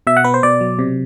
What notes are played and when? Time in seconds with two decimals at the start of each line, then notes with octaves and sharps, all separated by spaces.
0.07 B2 E5
0.17 F#5
0.24 B3 B4
0.34 C5
0.43 B2 D5
0.61 F#3
0.79 C3